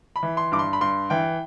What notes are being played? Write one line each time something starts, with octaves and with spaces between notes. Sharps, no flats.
B5
E3
C6
G2 D6
C6
B5
G2 C6
E3 G5